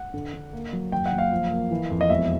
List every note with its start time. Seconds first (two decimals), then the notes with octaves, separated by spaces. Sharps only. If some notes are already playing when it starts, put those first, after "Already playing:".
Already playing: F#5
0.14 D3
0.34 D3
0.53 A#3
0.73 F#3
0.92 F#1 G5
1.06 F#5
1.12 F#1
1.18 F5
1.31 F3
1.51 A#3
1.71 E3
1.90 F2
2.01 D#5
2.10 E1 E5